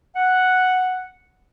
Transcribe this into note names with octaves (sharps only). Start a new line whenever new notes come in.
F#5